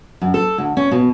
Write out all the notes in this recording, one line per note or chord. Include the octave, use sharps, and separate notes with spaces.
F#2
A4
D2
C#4
B2